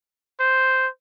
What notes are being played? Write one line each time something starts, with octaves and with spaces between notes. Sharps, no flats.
C5